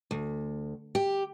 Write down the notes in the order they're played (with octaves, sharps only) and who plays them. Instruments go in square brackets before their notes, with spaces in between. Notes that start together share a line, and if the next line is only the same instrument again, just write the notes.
[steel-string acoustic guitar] D2
G4